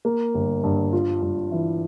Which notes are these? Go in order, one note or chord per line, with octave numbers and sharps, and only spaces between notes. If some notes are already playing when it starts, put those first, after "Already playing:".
A#3
G1
G2
F4
G2
E3